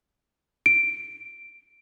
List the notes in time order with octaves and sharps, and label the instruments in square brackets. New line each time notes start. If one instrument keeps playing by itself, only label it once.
[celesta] D7